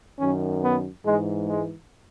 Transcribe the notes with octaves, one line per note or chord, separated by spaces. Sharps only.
F#2 D#3 C#4
B3
G#2 E3 G#3
G#3